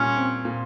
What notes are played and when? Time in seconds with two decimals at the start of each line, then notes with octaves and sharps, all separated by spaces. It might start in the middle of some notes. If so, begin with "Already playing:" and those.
Already playing: A#2 G3 C#4
0.15 C4
0.45 A#2